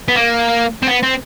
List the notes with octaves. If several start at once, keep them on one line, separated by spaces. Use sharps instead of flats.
B3
A#3
C4
B3
C4